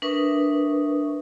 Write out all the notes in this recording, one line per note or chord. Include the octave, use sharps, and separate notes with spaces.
D4 A#4 B4 E5 C#6 D#6